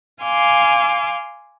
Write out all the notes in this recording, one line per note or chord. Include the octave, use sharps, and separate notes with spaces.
F5 G#5 C6 D6